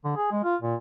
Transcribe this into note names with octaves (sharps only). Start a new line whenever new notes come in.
D3
G#4
G#3
F4
A#2